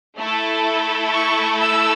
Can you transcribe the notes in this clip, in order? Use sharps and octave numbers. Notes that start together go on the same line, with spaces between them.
A3 E4 A4
C#6
E6